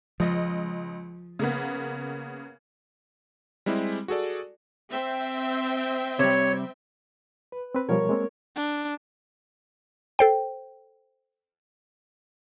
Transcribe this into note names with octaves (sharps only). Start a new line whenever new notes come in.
C#2 F3 D#5
C#3 A#3 B3
G3 G#3 C4 E4 G4
F#4 G#4 A4 D5
C4 E5 G5
C3 G3 C#5
B4
C4 B4
B2 F3 G3 A#4 C#5
G#3 A#3 C4
D4
A4 C5 G5